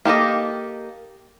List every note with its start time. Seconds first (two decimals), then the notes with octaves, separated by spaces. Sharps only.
0.05 A#3 G4 A4 D#5